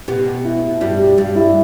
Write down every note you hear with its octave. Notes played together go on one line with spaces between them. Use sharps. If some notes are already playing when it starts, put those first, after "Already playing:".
B2 B3 G4
E4
G2 G3 F#4
G4
G2 G3
E4